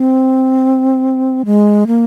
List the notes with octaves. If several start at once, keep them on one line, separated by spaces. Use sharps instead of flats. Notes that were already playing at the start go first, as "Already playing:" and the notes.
Already playing: C4
G#3
A#3